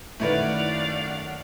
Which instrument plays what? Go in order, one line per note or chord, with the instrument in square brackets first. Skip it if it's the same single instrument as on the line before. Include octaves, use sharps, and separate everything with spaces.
[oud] F#2 E4 B4 [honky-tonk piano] D#3 A3 [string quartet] D5 F5 F#5